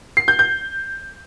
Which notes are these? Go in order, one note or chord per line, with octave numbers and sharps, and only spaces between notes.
C7
G6
G6